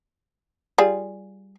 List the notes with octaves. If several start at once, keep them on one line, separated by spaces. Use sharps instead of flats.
G3 F4 G#4